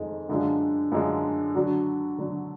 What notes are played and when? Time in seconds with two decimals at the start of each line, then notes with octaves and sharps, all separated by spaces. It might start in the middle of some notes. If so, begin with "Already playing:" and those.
Already playing: F2 D#3 G#3 D#4
0.29 F#2 D3 G#3 D4 F4
0.92 F#2 D3 G#3 D4 F4
1.55 D3 F#3 D4 F#4
2.19 D3 F#3 D4 F#4